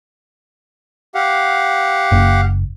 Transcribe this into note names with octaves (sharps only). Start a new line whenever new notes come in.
G4 F5 F#5
F#1